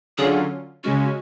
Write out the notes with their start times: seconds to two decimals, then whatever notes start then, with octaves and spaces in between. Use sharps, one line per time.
0.18 D3 F#3 C#4 F4 G#4
0.84 C#3 G#3 C#4 F#4